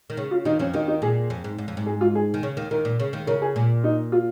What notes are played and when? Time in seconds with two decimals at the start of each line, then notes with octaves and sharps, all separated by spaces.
0.10 D#3
0.17 C#3
0.31 F4
0.45 D#2 D#3 D#4
0.59 F2 F3 C#4
0.73 D#2 D#3 D#4
0.88 D#4
1.02 A#2 G#4
1.30 F2
1.44 G#2
1.58 G#2
1.68 F2
1.77 G#2
1.86 G#4
2.01 F4
2.15 G#4
2.34 D#3
2.43 C#3
2.57 D#2 D#3
2.71 D#2 D#3 A#4
2.85 A#2
3.00 C#3
3.13 D#2 D#3
3.27 C#3 A#4
3.42 G#4
3.56 A#2
3.84 D#4
4.12 F4